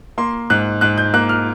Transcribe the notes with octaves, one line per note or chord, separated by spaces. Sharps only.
A#3 C6
G#2 F#6
G#2 F#6
G6
A#3 F#6
F6